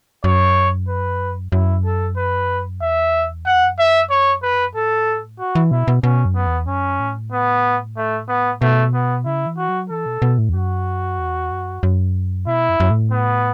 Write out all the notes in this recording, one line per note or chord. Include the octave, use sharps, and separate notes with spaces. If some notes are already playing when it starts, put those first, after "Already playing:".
F#2 C#5
B4
F#2 E4
A4
B4
E2 E5
F#2 F#5
E2
F#2
E5
C#5
B4
A2 A4
F#4
E3
B2 E4
B2
B2 C#4
F#2
B3
E2
F#2 C#4
A2
B3
A3
B3
B2 A3
B3
C#3 E4
E3
F#4
F#3
E3 A4
B2
B2
A2
E2
F#2 F#4
E2
F#2
F#2
B2 E4
F#2
F#2
A2
B3